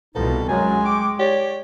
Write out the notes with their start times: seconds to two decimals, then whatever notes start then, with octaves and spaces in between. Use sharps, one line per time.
0.15 C2 B2 F3 B3 D#4 A4
0.48 F#2 F#3 G#3 G#5
0.85 G5 C#6 D6
1.19 G4 C#5 D5